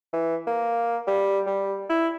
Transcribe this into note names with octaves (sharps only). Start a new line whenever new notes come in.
E3
A#3
G3
G3
E4